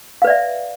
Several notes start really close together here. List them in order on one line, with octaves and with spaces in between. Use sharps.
F5 B4 D5 E5